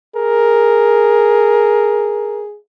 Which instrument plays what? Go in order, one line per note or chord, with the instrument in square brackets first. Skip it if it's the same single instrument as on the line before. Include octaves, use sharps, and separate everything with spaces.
[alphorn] G#4 [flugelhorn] A#4